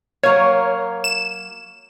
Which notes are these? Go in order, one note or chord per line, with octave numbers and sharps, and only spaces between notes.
F#3 A#3 C#5
E7